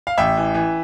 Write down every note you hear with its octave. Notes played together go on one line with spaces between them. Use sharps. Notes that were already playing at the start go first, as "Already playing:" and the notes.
F5
A1 E5 G5
E3
E3